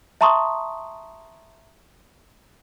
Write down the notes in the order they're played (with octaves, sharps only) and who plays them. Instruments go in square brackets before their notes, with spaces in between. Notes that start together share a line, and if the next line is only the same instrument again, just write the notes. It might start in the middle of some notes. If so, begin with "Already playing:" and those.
[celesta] E5 A5 A#5 C6 C#6 D#6